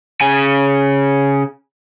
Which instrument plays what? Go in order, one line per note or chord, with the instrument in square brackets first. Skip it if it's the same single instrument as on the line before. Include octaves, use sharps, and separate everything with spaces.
[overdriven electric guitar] C#3 G#5